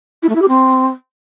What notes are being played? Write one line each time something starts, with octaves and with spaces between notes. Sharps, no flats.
E4
A3
E4
G4
C4